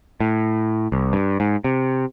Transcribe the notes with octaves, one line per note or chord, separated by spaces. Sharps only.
A2
C2
G2
G#2
C3